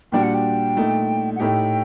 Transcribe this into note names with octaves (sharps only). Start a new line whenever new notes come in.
A#2 G3 D4 F#4 G5
F#5
G5
A#2 A3 D#4
F#5
A2 A3 D#4 G4 G5